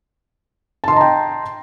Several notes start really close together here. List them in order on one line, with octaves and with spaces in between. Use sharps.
A5 C6 D#5 A#5 G5